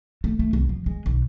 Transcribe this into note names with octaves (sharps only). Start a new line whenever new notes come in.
A3
A3
C2
F3
G#3
B1